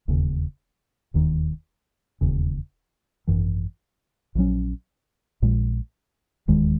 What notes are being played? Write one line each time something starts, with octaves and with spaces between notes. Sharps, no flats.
E1 D#2 C#3
E1 D#2 D#3
E1 D#2 C#3
G#1 F#2 E3
A#1 G#2 F#3 C#4
A#1 A#2 G#3
E1 D#2 D#3 G#3